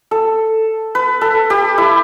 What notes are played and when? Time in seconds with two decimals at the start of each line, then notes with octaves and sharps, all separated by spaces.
0.11 A4
0.95 B4
1.21 A4
1.50 G4
1.78 E4